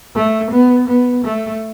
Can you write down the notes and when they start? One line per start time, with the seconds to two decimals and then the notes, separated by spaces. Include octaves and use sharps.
0.15 A3
0.51 B3
0.88 B3
1.25 A3